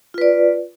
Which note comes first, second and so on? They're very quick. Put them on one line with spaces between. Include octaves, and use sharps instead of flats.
F4 B4 D5